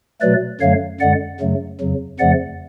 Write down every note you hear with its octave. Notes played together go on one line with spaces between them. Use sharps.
B2 F#3 A3 B4 D5
F#2 D3 F#3 A3 C#5 F5
F#2 D3 G#3 D5 F#5
F#2 C#3 F#3 A3
F2 C#3 F#3
F2 C#3 F3 A3 D5 F#5